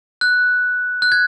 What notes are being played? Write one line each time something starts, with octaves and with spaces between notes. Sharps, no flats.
F#6
F#6
G#6